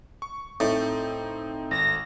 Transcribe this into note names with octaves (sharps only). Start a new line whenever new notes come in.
C#6
A2 C4 D#4
G#1 A#6